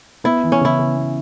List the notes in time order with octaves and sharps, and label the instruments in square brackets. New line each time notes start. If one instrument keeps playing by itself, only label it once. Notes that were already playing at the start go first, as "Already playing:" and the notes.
[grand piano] B3 [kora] E4
[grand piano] E3
[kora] C#4
[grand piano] C#3 [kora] E4
[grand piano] C#3
B3